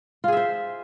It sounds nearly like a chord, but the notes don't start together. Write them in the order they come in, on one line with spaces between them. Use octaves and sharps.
F4 G#4 E5 C5